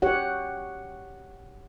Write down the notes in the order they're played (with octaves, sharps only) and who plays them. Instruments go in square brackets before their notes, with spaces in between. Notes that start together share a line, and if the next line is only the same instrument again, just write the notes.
[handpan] G4 C#5 F#5